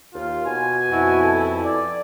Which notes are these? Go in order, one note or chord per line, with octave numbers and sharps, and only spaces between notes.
D#2 F4
B2 G#5
F2 E4 F#4
A4
D5